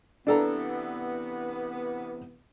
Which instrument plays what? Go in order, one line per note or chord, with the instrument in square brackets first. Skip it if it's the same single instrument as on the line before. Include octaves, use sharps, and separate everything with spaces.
[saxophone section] C3 E3 B3 [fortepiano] D4 A4 A#5